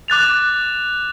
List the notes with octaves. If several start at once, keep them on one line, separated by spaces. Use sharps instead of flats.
D6 F#6 A6 F7